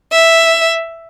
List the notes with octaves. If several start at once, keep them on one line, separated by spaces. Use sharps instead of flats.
E5